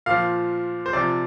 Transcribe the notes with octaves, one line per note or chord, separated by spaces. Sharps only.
A#2 F3 F5
C5
C3 F3 D5